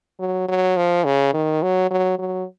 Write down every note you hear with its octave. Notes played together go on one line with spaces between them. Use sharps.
F#3
F#3
F3
C#3
D#3
F#3
F#3
F#3